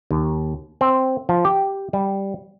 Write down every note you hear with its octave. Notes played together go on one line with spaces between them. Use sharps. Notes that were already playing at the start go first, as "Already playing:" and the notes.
D#2
C4
F3
G4
G3